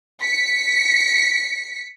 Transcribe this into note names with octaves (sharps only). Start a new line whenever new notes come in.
B6 C#7